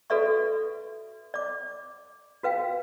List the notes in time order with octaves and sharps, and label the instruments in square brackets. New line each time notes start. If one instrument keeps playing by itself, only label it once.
[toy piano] F#4 A4 B4 D5 E5 C#6
D5 D6
F#4 B4 F5 G5